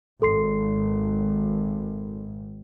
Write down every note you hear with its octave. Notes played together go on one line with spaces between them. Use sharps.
G#1 A4 C6 C7